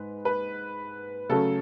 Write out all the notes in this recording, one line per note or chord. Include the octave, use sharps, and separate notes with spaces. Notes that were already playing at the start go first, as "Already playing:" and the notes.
Already playing: G#2 G#3 B4
B4
C#3 F#3 A3 A4